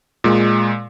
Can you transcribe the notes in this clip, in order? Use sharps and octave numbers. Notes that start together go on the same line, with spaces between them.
A#2 G#3